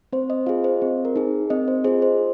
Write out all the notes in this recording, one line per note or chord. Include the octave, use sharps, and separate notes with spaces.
C4 C5
D#5
F4 G#4 F5
C5
C4
A#4
D#4 G#4
C4 D#5
C5
F4 G#4 C5
C5